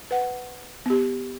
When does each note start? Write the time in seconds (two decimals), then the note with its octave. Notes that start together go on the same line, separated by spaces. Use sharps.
0.11 B4 F#5
0.86 B3 G4